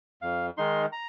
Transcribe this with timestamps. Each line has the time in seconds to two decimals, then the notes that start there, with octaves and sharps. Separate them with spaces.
0.22 F2 F5
0.57 D#3 G#3 D#4 C6
0.92 A#5